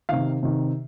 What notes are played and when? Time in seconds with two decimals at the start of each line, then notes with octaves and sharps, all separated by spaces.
0.09 C3 D#3 F5
0.43 C3 D#3